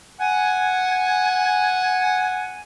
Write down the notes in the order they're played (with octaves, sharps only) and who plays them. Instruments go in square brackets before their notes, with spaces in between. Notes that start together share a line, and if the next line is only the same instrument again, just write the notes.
[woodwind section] F#5 G#5